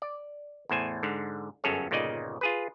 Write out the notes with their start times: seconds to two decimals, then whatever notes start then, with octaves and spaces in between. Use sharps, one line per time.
0.02 D5
0.69 E2 A2 C5 G#5
1.03 G#2 D3
1.64 G1 F#2 C#4 G#4 A4 C#5
1.91 G1 A#2 C#3 D#4 D5 D#5
2.41 F4 G#4 B4